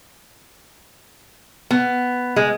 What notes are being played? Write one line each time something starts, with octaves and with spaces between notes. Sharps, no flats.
B3
G#3